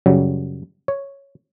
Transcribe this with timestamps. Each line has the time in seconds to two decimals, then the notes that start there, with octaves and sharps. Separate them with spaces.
0.06 F#2 C#3 F#3 G3
0.88 C#5